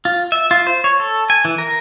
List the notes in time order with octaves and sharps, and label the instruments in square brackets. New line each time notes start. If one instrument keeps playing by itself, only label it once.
[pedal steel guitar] F4
E5
F4
C5
C#5
A4
G#5
E3
A#4